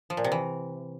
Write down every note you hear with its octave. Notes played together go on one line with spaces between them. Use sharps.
F3
A#2
C3
E3